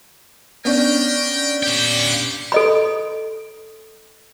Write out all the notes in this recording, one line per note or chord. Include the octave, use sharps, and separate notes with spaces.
B3 C#4 D4 A#4 G5
A#2 G4 G5
A4 D#5 B5